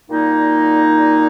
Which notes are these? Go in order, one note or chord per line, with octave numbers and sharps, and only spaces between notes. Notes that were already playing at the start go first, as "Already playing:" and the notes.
A#2 G3 A#3 D#4